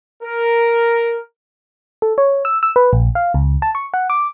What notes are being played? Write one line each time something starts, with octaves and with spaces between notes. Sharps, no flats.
A#4
A4
C#5
E6
E6
B4
A#1
F5
C#2
A5
C#6
F#5
D6